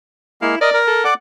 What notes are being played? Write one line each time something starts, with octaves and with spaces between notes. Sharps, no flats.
G#3 A#3 E4 F5
A#4 D5 D#5
A#4
A4
D5 F#5 D6